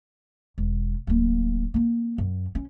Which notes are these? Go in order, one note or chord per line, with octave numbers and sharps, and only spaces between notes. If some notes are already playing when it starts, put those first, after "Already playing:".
E1
D1 A#3
A#3 C4
F#2
C#4